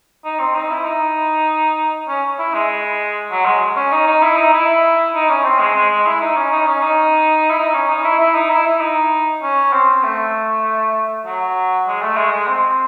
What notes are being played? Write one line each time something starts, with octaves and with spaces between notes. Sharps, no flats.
D#4
C4
D#4
E4
D#4
C#4
E4
G#3
F#3
G#3
C#4
D#4
D#4
E4
D#4
E4
D#4
C#4
C4
G#3
G#3
G#3
E4
D#4
C#4
D#4
C#4
D#4
E4
D#4
C#4
D#4
E4
E4
D#4
E4
E4
D#4
C#4
C4
A3
F#3
G#3
A3
G#3
G#3
C4